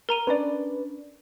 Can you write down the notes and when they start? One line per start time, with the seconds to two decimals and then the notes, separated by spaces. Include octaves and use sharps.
0.09 A#4 A#5 D#7
0.27 C#4 D4 B4 D5